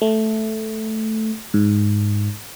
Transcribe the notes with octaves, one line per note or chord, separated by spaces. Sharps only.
A3
G#2